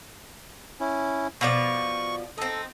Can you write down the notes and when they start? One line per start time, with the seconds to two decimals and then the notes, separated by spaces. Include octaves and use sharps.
0.80 C#4 E4
1.41 B2 F3 D5 C#6
2.38 C4 D#4 A4